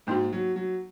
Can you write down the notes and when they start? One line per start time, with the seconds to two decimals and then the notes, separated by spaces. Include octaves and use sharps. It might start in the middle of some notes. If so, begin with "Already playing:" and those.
0.07 G#2 A#3 D#4 F#4
0.33 F#3
0.56 F#3